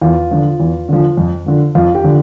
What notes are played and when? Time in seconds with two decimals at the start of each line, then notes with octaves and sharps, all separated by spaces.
0.02 E2 F4
0.31 D3 F3
0.60 E2
0.89 D3 F3
1.17 F2
1.46 D3 F3
1.75 F2 F4
1.95 G4
2.04 D3 F3